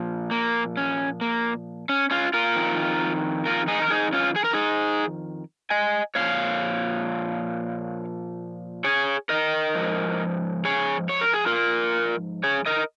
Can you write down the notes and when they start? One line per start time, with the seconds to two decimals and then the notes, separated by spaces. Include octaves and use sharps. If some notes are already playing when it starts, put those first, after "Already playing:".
Already playing: A#2 F3
0.31 A#3
0.77 C#4
1.21 A#3
1.89 C#4
2.11 C#4 F4
2.34 F4 A#4
2.56 F2 D#3
3.45 F4 A#4
3.68 D#4 G#4
3.82 A#4
3.90 D#4 G#4
4.13 C#4 F4
4.36 G#4
4.44 A#4
4.53 D#4 G#4
5.70 D#5 G#5
6.15 A#2 F3 C#5 F5
8.84 G#4 C#5
9.29 A#4 D#5
9.75 G#2 F3
10.65 G#4 C#5
11.09 C#5
11.21 A#4
11.33 G#4
11.46 F4 A#4
12.44 G#4 C#5
12.66 A#4 D#5